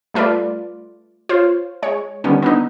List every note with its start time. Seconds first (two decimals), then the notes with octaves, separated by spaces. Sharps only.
0.14 G3 A3 F4 B4 D5
1.29 F4 C5 C#5
1.82 G#3 C#5
2.24 D3 D#3 G3 B3 C#4
2.42 B3 D4 D#4